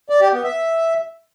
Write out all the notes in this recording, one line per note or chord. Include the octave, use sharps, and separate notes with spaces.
D5
G4
B3
E5